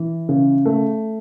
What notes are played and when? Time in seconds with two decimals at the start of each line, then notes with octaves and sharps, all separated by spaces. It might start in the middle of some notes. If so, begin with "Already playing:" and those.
Already playing: E3
0.29 C#3
0.66 A3